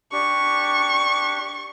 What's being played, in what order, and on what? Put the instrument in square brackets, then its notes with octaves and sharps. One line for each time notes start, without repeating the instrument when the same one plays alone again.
[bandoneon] D4 G4 [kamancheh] C#6